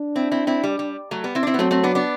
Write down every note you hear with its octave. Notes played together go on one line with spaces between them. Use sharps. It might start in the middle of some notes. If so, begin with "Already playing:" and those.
Already playing: D4
C4 E4
C4 E4
C4 E4
G3
G3
F#3 A3
G3 B3
C4 E4
D4
C4 E4
B3
F#3 A3 C4
A3 C4
B3 D4
B3 D4